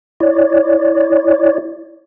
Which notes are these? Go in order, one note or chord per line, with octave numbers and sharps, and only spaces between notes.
E4 C#5 D5